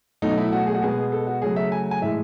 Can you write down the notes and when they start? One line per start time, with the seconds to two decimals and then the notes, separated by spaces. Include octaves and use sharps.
0.22 B2 F#3 A3 D#4
0.37 E4
0.52 F#4
0.67 G#4
0.75 F#4
0.82 B2 G#3 B3 G#4
1.12 A4
1.27 F#4
1.42 C#3 F#3 A3 G#4
1.56 E5
1.72 G#5
1.91 G#5
2.02 A2 E3 G#3 E5